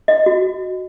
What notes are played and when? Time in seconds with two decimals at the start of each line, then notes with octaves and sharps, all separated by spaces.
0.08 D#5
0.26 F#4